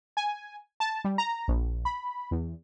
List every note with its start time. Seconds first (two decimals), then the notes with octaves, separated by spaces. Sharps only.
0.17 G#5
0.80 A5
1.04 G3
1.18 A#5
1.48 A#1
1.85 B5
2.31 E2